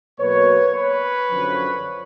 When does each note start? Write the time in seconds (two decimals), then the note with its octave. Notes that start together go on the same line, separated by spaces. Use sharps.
0.19 B2 F#3 A#3 B4 C#5
0.75 B4 C#5
1.31 F#2 D3 F3